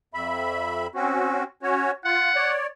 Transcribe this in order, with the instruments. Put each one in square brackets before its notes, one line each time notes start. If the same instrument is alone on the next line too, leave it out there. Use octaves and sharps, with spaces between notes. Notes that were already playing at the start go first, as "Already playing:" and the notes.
[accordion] F2 E5 B5
C4 C#4 F#4
C#4 F#4 C#5
[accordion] F4 [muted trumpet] F#5
[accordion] C#5 D5